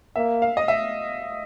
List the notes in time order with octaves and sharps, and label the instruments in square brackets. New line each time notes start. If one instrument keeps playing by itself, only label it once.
[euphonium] A#3 [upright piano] E5
[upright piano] F5
D#5
E5